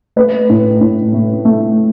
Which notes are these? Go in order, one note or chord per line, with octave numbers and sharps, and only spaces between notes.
A3 B4
A2
A2
A3
A3